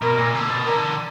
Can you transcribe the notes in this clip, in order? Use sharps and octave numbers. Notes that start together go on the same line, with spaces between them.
B2 A#4 A#5
A#2
D3
B2
D3 A#4 A#5